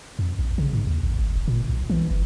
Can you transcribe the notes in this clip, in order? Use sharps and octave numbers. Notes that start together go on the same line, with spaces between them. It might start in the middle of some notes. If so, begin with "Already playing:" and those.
F2
A#1
C#3
G#2
D#2
A1
G#1
D1
A#2
B1
E3
F#1